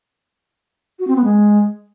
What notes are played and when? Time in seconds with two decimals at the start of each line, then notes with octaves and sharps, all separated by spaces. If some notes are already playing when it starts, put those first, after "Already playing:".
0.99 F#4
1.07 C4
1.16 B3
1.24 G#3